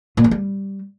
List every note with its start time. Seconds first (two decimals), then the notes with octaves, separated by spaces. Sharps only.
0.17 A#2
0.24 F3
0.31 G3